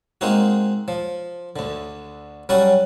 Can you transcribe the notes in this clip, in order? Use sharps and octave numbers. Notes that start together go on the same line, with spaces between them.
G#3 A#3 C4 D#4 F#4
F3
D2 D3
F#3 G3 C#4 F#4 D5